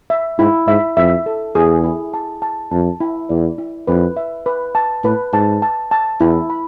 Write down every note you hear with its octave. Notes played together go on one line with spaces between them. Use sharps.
E5
G#2 E4
G#2 E5
F2 E5
A4
E2 G#4
E4
A5
A5
F2 A5
E4
E2 D5
E4
F2 B4
E5
B4
A5
A2 B4
G#2 A5
A5
A5
E2 E4
B5